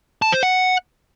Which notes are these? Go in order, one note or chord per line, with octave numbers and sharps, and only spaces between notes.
A5
C5
F#5